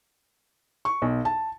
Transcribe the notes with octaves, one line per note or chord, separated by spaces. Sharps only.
C#6
B1
A5